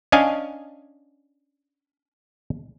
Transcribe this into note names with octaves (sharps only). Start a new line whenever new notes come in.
C#4 D4 D#5 F5 G#5